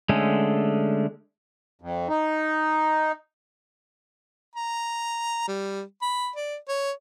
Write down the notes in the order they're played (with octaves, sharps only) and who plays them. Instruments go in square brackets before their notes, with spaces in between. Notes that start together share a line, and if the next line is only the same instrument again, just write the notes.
[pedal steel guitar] D3 G#3 A3 C#4
[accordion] F2
D#4
[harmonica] A#5
G3
B5
D5
C#5